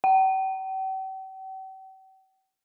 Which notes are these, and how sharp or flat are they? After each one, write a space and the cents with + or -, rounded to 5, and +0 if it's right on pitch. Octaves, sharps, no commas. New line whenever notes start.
G5 -45